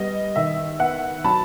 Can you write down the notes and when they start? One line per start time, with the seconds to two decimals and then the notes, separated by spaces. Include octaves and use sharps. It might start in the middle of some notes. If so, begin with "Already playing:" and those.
Already playing: G3 B3 D#5
0.36 D#3 E5
0.79 B3 E5 F#5
1.24 F#3 A5 B5